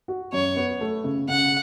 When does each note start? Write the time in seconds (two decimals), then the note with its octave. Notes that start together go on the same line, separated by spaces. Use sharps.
0.08 F#4
0.32 F#2 C#5
0.56 B3
0.81 A3
1.04 C#3
1.28 C#3 F#5